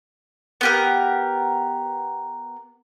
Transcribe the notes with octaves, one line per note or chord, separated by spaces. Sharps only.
B3 G4 A#4